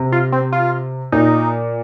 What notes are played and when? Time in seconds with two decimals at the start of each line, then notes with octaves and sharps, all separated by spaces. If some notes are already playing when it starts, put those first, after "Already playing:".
Already playing: C3
0.12 F4
0.32 C4
0.52 F4
1.12 A#2 D#4